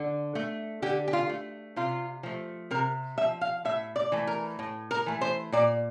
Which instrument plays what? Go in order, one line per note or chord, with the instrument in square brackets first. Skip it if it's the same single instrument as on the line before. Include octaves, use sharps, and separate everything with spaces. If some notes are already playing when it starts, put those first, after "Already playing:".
Already playing: [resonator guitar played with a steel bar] D3
A3
D3 G4
G4
F4
A3
C3 F4
F3 A3
C3 A#4
A3 E5
F3
F5
A2 E5
D5
E3 A3
A#4
A2
A#4
E3 A3
C5
A#2 D5